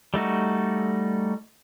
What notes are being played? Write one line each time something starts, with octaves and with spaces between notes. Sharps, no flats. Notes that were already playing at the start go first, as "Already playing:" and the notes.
G3 A3 D#4 F#4